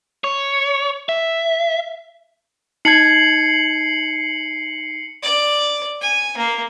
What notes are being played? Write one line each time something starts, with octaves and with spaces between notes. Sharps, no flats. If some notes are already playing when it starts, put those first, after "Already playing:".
C#5
E5
D#4 A5 G#6 C7 C#7 F#7
D5
G#5
A#3